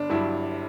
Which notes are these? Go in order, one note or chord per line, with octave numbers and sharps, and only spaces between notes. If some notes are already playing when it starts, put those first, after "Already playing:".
Already playing: G1 D4
G2 F#3 E4